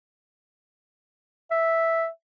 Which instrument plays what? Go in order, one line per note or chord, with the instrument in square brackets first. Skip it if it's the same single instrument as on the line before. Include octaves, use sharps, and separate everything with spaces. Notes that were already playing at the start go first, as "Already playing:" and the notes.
[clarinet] E5